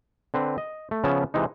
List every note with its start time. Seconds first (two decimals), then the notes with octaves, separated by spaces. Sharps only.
0.34 D3 C4 B4
0.58 D#5
0.91 A3
1.04 C#3 F3 B3 C#4 E5 A5
1.34 C3 E3 G#3 D#4